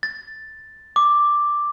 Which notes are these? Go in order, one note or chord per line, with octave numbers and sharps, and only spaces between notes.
A6
D6